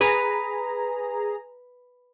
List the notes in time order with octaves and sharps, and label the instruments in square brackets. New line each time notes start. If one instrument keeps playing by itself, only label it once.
[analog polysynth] G#4 A#5 [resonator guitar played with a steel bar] B4